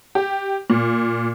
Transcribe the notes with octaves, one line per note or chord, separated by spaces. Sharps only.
G4
A#2